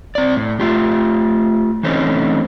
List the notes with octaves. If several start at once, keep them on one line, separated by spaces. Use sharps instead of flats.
C4 D5
A2
A3 F4 G4
E3 A3 C4 C#4 D#4